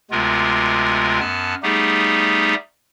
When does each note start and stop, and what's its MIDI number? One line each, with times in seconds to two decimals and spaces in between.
0.11 1.20 38
0.11 1.20 48
0.11 1.20 56
0.11 1.20 59
0.11 1.20 65
0.11 1.20 70
1.20 1.55 42
1.20 1.55 59
1.20 1.55 81
1.20 1.55 89
1.63 2.55 55
1.63 2.55 57
1.63 2.55 59
1.63 2.55 63
1.63 2.55 67
1.63 2.55 68